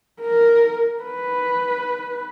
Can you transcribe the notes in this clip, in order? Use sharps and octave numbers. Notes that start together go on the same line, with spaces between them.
A#4
B4